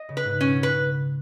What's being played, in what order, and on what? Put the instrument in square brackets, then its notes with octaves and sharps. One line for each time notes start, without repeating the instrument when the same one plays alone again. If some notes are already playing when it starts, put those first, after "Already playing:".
Already playing: [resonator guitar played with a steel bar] D#5
[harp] C#3
[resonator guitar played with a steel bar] B4
[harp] G#2
[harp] B2 [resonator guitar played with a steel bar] C#4
[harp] C#3
[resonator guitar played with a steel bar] B4